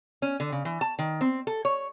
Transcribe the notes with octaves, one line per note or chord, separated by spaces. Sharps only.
C#4
D3
C#3
E3
A5
D#3
C4
A4
C#5